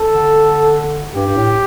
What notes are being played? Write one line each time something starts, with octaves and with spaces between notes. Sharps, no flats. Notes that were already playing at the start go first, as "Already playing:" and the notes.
Already playing: A4
D3
G2 G4
G2
A2